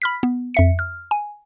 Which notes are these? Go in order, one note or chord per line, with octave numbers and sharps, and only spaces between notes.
B5 F6 B6
B3
F2 E5 C#7
F6
G#5